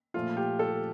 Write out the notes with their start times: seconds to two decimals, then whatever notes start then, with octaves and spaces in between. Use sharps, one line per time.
0.14 A#2 F3 A3 F4
0.37 G4
0.59 A4